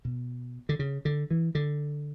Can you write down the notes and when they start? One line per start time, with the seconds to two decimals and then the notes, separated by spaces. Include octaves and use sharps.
0.05 B2
0.69 D3
0.79 C#3
1.05 D3
1.30 E3
1.55 D3